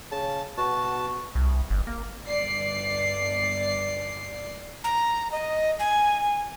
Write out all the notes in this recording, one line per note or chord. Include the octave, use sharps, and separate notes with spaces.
C#3 A5
B2 F#4 A5
C2
G1
A#3
G1 D5 C7
A#5
D#5
G#5